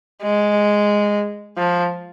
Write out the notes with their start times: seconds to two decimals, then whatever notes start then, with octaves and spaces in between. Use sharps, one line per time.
0.22 G#3
1.58 F3